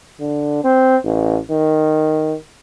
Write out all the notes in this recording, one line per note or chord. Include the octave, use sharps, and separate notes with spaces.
D3
C4
A1
D#3